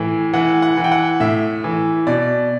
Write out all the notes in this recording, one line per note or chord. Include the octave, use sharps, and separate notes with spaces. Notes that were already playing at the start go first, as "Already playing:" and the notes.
Already playing: A2 E3
E3 F#5
F#5
E3
G5
F#5
A2 E5
E3
B2 D5